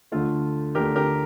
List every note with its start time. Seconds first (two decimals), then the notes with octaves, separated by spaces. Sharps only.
0.12 D2 D3 A3 F4 A4
0.75 D2 D3 A3 G4 A#4
0.96 G4 A#4